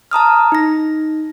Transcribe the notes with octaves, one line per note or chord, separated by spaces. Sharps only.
A5 A#5 D#6 F6
D#4 A#6